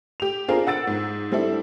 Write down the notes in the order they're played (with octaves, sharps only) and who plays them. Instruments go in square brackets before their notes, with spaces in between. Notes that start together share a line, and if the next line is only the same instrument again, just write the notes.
[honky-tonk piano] G4 F7
C4 D4 F4 G#4 A#4
F#5 E6 A6 D7
G#2
G3 C4 D4 E4 A4